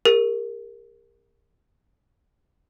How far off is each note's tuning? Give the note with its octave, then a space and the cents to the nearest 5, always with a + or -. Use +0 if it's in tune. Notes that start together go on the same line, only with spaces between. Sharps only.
G4 +45 A#4 +0